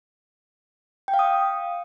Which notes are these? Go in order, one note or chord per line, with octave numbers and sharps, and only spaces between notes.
G5
F5
D#6